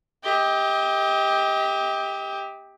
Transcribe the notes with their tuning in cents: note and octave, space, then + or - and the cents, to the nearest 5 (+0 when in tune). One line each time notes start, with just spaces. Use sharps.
G4 +10 D#5 +40